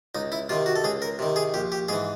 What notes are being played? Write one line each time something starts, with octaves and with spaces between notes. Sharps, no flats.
C#2 D#4
E4
C3 D#3 F4
F#4
A4
C#2 G#4
A#4
C3 D#3
G#4
A#1 G4
G4
G#2 E3 G#4